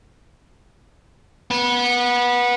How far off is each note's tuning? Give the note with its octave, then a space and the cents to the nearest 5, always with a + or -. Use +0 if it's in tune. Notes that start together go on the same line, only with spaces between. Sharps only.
B3 -20